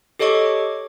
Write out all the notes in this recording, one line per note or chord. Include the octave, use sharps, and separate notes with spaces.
G4 A4 C#5 D#5 C#6 D6